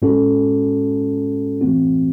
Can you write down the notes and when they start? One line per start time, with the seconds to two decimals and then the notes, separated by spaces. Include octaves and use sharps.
0.02 A2 G#3 C#4 F#4 A4
1.61 A2 E3 A3 C4 F#4